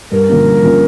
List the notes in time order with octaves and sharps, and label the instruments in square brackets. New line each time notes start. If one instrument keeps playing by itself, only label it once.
[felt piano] G2 [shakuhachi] A#4
[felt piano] D3 F3 A#3 C#4
G2
D3 F3 A#3 C#4